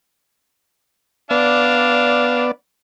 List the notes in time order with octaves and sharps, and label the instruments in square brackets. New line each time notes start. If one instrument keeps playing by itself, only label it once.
[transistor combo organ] B3 D5 [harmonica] D4 F5